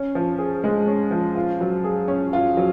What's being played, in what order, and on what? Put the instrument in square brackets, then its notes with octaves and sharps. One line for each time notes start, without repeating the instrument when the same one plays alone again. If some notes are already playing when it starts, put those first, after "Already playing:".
Already playing: [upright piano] C#4
F3
G#4
G#3
C#4
F3
F4
F#3
G#4
C#4
F4
F#3